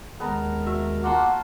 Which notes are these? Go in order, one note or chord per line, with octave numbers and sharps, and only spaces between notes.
D#2 G#3 B3 A#4 A5 A#5
F#4 E5
A#3 F4 F#4 A5 C6 D6